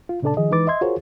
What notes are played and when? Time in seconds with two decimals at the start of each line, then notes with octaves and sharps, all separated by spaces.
0.09 F4
0.22 A#2 C#3 D4 A4 D5 A5
0.37 D#3 F3 G#4 D#5
0.51 E3 G#3 D#4 B4 D6 A6
0.67 D#5 E5 C6 G#6
0.81 F4 F#4 G#4 A#4 C5 C#5